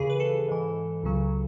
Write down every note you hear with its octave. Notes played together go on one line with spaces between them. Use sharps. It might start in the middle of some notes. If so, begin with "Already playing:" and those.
Already playing: D#2 C#3 E3 G#4
B4
A4
G#2 E3
C#2 C#3 F#3